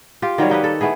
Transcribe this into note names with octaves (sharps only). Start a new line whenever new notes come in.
F4 G4
D#3 F#3 G3 C#5
A#3 D#4 G4 B4
A4
A3 B3 E4 G#4